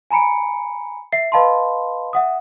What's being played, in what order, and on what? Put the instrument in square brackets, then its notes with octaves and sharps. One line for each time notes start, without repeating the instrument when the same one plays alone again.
[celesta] G#5 A#5 B5 C#7 D7
E5 C7
B4 D#5 F5 A5 B5 C6
E5 F#5 D#6